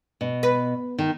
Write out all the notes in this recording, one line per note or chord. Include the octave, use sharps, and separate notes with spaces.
B2
B4
D#3